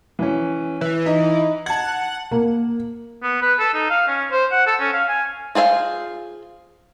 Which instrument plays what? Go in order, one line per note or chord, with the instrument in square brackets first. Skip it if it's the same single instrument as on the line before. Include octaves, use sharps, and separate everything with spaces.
[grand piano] E3 C#4
[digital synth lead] E3
[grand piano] D#4
[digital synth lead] F#5 [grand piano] A5 G#6
[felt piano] A#3
[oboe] B3
B4
A4
D#4
F5
C#4
C5
F#5
A4
C#4
F5
G#5
[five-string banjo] F4 G#4 C5 E5 F5